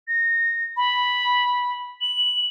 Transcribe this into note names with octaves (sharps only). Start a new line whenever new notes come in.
A#6
B5
F#7